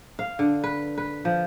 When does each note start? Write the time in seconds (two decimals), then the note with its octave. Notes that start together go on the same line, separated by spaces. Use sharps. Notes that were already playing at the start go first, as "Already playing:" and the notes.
0.19 F5
0.39 D3
0.64 B4
0.98 B4
1.25 F3